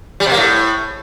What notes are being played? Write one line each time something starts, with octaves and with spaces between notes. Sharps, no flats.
G3
C3
A#3
A2